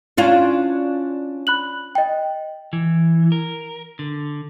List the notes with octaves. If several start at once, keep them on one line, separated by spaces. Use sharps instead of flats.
C#4 D4 E4 F4
B5 F#6 F#7
D#5 G5
E3
A#4
D3